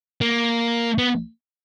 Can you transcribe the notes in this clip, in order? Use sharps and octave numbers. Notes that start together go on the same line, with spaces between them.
A#3
B3